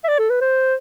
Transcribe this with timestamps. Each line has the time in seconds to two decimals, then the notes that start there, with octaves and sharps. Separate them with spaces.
0.04 E5
0.08 D5
0.19 A4
0.30 B4
0.41 C5